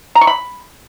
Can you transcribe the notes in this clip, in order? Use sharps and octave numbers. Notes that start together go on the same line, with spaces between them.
A#5
C#6
B5